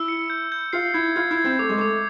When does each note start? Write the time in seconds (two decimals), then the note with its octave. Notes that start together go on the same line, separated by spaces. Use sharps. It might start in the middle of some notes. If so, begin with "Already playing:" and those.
Already playing: E4 E6
0.08 C#7
0.30 G6
0.52 G6
0.73 F4 C7
0.94 E4 G#6
1.16 F4 G#6
1.31 E4
1.37 G#6
1.44 C4
1.59 A3 D6
1.69 G#3
1.78 A3 D6